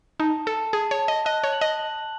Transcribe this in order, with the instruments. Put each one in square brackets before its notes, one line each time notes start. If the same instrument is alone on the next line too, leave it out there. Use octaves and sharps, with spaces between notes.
[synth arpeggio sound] D#4 [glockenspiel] A5
[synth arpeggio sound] A4 [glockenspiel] A5
[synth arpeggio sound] G#4 [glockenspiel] A5
[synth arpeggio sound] C#5
[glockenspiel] A5
[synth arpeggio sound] D#5
[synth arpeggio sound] D#5 [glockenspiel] F#6
[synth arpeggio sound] C#5
[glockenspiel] F#7
[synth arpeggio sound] D#5
[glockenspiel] F#7